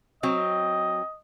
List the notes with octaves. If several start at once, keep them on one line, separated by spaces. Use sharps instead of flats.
F#3 C4 D#5